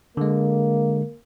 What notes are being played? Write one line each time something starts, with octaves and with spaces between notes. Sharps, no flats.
D3 G#3 A#3